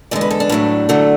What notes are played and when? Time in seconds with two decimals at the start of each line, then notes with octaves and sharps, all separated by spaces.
0.11 E2 D3 G#3 D5
0.21 B4
0.31 A4
0.40 D4
0.49 A2 F#3 A3
0.89 D2 D3 F#3 A3